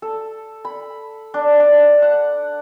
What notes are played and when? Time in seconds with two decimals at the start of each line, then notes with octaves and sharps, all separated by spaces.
0.02 A4
0.65 B5
1.34 D4
1.60 D4
2.02 F#5